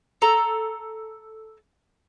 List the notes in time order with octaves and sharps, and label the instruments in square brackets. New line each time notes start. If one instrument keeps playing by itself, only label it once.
[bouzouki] A4 A#5